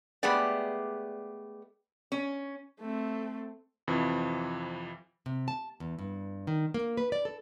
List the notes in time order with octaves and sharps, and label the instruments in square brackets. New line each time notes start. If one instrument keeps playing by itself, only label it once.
[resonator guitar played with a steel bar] G#3 A3 B3 G4 G#4 D5
C#4
[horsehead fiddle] A3 C4
[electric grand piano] F2 C3 E3 F3
[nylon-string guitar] C3
A5
E2
G2
D#3
A#3
B4
D5
A4